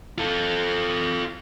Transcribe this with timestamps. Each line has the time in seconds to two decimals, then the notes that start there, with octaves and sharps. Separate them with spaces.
0.18 F4 A4